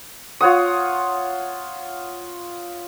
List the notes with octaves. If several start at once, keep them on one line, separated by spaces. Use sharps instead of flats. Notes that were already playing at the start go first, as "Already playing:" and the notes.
F4 C#5 F#5 D#6